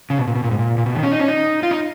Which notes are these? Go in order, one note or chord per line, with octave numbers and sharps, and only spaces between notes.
C#3
B2
A#2
B2
A#2
G#2
A#2
A#2
B2
D#3
C#4
D#4
C#4
D#4
F4
D#4